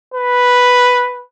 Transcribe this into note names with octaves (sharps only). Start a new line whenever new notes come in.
B4